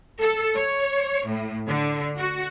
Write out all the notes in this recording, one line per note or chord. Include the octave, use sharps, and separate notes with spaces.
A4
C#5
A2
D3
F#4